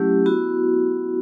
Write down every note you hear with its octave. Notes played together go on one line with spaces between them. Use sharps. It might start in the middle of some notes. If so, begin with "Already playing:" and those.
Already playing: F#3 A3 C#4 E4 G4
B3 E4 F#4